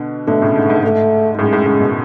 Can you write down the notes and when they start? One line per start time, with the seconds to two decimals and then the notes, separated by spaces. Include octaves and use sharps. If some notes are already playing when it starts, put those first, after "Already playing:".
Already playing: B2 D3
0.27 B2 D3 A3
0.41 A2 C#3
0.56 G#2
0.70 G#2
0.83 G#2 A3
1.35 G#2
1.39 F#2 A2 G#3
1.53 F#2 A2
1.66 A2 C#3
1.80 B2